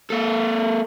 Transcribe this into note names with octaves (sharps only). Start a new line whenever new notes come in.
A#3 A4